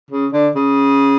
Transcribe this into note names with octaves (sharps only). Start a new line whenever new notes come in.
C#3
D3
C#3